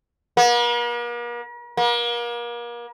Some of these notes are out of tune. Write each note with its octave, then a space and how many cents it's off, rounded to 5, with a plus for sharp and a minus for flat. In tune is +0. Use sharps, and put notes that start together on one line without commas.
A#3 +45
A#3 +35